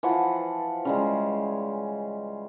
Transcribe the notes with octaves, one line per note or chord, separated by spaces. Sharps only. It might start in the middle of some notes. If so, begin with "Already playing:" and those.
E3 F3 F#5
C#3 G3 G#3